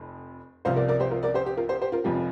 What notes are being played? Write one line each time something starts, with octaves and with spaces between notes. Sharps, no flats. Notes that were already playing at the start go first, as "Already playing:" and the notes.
Already playing: F1 F2
C2 C3 F3 C5 F5
A#4 D5
A#4 D5
G4 C5
F4 A#4
A#4 D5
G4 C5
G4
F4 A#4
G4 C5
G4 C5
F4 A#4
F1 F2 F3 G4